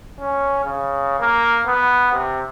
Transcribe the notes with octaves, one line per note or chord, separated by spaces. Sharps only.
C#4
C#3
A#3
B3
C3